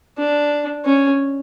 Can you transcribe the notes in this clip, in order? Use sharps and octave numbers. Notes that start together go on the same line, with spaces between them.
D4
C#4